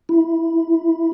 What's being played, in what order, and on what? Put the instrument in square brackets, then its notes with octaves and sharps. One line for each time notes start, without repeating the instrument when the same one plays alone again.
[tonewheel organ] E4